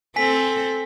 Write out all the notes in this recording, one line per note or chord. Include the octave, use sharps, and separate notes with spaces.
C4 A4 G#5 B6